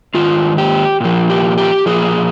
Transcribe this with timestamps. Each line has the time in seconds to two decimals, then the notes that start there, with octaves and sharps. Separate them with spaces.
0.14 G#2 D#3 F4
0.58 G4
1.01 A#2 F3
1.30 G4
1.58 G4
1.86 A#2 F3 G#4